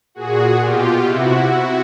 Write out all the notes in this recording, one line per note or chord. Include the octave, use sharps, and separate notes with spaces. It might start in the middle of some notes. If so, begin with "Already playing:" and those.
A#2 F#4 G#4
B2 F4 G4
C3 E4 F#4